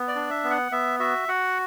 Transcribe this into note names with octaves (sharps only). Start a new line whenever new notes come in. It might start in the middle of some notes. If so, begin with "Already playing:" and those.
Already playing: B3
D5
D4
E5
B3
F#5
B3 E5
F#4 E5
F#4 F#5